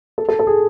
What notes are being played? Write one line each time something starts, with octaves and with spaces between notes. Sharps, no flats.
A4
A4
A4
G#4